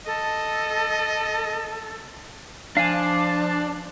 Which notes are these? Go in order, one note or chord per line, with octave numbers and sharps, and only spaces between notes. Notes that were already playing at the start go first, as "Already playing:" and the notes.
A4 D#5
F3 D4 F5 G#5